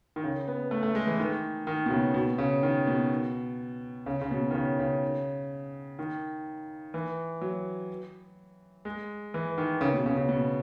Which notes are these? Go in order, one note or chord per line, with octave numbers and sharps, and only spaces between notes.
D#3
C#3
B3
A3
A3
G#3
E3
D#3
D#3
B2
C#3
B2
C#3
D#3
B2
C#3
C#3
B2
D#3
C#3
C#3
D#3
E3
F#3
G#3
E3
D#3
C#3
B2
C#3
C#3
B2